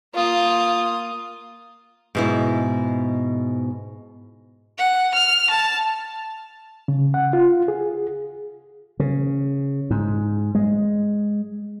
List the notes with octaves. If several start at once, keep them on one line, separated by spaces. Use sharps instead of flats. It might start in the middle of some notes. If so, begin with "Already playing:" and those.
A#3 F4 D#6
G#2 B2 E4
F#5
F6
A5
C#3
F#5
F4
G#4
C#3
G#2
G#3